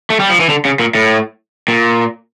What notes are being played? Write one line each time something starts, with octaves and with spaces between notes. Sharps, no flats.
A3
G3
F3
E3
D3
C#3
A#2
A2
A#2